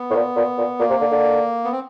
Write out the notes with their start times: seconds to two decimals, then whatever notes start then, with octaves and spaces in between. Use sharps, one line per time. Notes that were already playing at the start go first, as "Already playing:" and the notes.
Already playing: B3
0.10 A2
0.15 A#2
0.36 A#2
0.58 A#2
0.79 A#2 A#3
0.89 C3
1.01 D3
1.11 D3
1.64 B3
1.72 C4